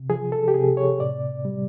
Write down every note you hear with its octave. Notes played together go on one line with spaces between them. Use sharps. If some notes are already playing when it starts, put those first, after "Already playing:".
Already playing: C3
F3 G#4
A4
G4
C3 G#4
C#5
A2 D5
G3